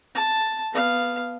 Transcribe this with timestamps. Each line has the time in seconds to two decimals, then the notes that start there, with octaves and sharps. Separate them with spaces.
0.14 A5
0.72 B3 F5